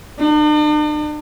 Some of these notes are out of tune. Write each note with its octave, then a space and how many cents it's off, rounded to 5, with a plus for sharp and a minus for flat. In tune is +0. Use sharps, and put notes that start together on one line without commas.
D4 +45